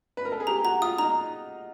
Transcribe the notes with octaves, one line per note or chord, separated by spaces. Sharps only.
B4
A#4
A4
G#4
G4 A#5
F#4 A#5
F4 D#6
D#4 A#5